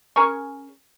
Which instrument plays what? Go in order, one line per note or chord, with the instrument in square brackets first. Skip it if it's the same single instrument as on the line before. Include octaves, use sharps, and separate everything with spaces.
[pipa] C#4 G#4 A#4 C#6